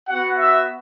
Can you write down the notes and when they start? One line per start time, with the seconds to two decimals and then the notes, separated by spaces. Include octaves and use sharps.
0.09 B3 F#4 F#5
0.38 E5